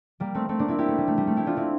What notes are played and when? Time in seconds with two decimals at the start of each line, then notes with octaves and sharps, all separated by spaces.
0.20 G3 A#3
0.35 A3 C4
0.49 A3 C4
0.59 A#3 D4
0.68 C4 E4
0.78 E4 G4
0.88 A3
0.98 G3
1.07 A3
1.18 G3
1.27 A3
1.37 E4 G4
1.46 D4 F4
1.57 C4 E4